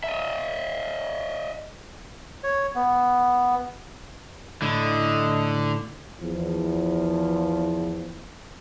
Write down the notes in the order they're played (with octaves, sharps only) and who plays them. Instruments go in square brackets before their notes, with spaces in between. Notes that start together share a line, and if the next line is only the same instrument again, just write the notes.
[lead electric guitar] D#5 E5
[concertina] C#5
B3
[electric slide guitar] A2 E4 [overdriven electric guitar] D3 [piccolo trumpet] D#5
[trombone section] E2 F3